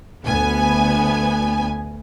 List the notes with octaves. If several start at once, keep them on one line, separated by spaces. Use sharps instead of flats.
D2 B3 G#5